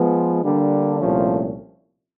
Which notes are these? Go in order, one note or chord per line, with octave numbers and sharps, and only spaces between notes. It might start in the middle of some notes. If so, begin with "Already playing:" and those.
Already playing: F3 G#3 B3
D3 G3 A#3 D4
C2 A#2 F3 A3 C#4